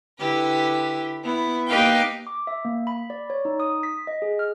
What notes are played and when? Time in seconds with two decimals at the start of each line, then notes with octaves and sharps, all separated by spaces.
0.17 D3 E4 G4 B4
1.23 B3 E4
1.67 A#3 D#4 G4 B4 F5 G5
2.27 D6
2.47 E5
2.65 A#3
2.87 B5
3.10 D5
3.30 C#5
3.45 D#4
3.60 D#6
3.83 B6
4.07 D#5
4.22 G#4
4.39 F6